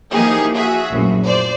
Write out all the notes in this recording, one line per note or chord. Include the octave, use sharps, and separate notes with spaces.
E3 F3 A#3 D#4 G4 G#4
F#4 G#4 E5
A#1 F#2 A2
C5 D5